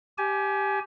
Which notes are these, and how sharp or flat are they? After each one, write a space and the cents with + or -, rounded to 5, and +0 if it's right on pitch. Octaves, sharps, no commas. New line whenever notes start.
G4 +0 G#5 +25